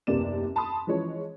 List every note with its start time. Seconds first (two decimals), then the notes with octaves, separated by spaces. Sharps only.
0.07 F#1 D#2 C3 B3 D5 E7
0.56 A5 B5 C6 D#6
0.87 E3 F3 G#3 C#4 C#5